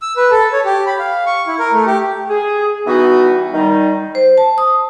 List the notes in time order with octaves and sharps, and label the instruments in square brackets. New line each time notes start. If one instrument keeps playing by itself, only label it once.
[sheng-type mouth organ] E6
B4
A4
C#5
G4
B5
F5
C#6
E4
A#4
A3
G4
[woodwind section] G#4
E3 G3 B3 D#4 F#4
D#3 G3 D#4
[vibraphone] C5
A5
D#6